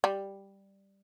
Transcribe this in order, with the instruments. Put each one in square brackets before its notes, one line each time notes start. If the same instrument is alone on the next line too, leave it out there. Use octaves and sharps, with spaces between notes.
[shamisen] G3